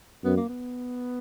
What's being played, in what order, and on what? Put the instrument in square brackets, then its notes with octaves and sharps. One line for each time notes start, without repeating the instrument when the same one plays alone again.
[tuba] F#2 [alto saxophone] B3
[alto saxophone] A#3
B3